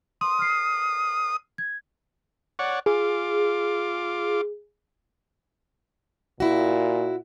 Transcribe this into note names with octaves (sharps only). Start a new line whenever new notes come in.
C6 D#6
F6 C7
G#6
C#5 D5 F#5
F4 G#4 D6
A#2 E4 F#4